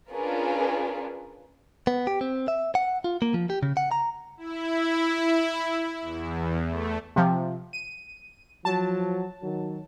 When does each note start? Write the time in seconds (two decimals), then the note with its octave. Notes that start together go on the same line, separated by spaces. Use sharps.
0.12 C#4 D4 F4 G#4 A#4 B4
1.87 B3
2.07 G4
2.21 C4
2.48 E5
2.75 F#5
3.04 F4
3.22 A#3
3.34 F3
3.50 G4
3.63 C#3
3.77 F#5
3.91 A#5
4.37 E4
6.01 E2
6.66 A3
7.16 C3 F3
7.73 D#7
8.65 F3 F#3 A5
9.43 D#3 F#3